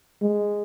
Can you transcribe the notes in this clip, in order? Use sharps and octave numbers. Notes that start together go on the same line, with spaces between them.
G#3